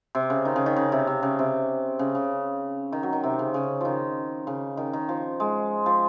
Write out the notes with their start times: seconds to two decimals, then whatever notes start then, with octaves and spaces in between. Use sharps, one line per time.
0.15 C3
0.30 C#3
0.45 D#3
0.56 C#3
0.66 D#3
0.76 C#3
0.92 C3
1.07 C3
1.23 C#3
1.39 C3
1.99 C#3
2.15 C#3
2.92 D#3
3.03 F#3
3.13 D#3
3.24 C3
3.39 C#3
3.54 C#3
3.81 D#3 F3
4.47 C#3
4.77 D#3
4.93 D#3
5.09 F3
5.40 G#3
5.86 F3